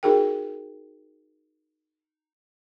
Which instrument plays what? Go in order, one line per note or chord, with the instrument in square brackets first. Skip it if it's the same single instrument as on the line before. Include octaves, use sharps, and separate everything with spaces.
[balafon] D#4 F#4 G#4 A#4 G5